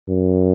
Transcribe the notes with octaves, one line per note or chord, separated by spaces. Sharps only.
F#2